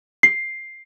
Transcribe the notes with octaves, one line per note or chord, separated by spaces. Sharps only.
C7